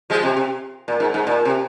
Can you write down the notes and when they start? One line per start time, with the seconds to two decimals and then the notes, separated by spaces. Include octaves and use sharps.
0.10 F3 G#3
0.23 C3
0.37 C3
0.88 A#2
1.00 G#2
1.14 G#2
1.27 A#2
1.45 C3